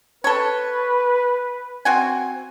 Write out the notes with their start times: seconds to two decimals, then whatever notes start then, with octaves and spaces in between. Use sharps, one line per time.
0.24 A4 B4 C#5
1.85 C4 F#4 G#5